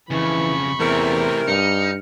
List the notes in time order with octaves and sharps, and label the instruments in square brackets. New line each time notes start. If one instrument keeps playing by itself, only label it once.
[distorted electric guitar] F2 C#3 [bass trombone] E3 [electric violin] B5 C#6
[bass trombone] E2 [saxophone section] C3 A#4 [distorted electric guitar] E3 A3
[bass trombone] G2 [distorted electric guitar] D#4 [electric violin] F6 C#7